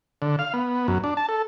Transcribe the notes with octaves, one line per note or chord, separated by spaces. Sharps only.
D3
F5
B3
F#2
D4
A5
A4